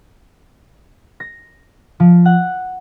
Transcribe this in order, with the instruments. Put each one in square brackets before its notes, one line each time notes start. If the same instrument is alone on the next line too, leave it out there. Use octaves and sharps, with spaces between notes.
[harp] A#6
F3
F#5